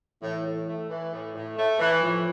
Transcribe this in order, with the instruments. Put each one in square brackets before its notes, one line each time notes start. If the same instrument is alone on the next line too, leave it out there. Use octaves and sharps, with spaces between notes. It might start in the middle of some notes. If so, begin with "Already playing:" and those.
[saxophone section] A2 [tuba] E3
[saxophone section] A2
A3
E3
A2
A2
A3
E3
[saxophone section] A2 [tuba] F3